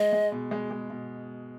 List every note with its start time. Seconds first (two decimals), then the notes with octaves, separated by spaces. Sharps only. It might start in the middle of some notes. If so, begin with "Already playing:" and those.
Already playing: G#3 D#5
0.13 G#3
0.32 B2
0.51 G#3
0.71 G#3
0.90 B2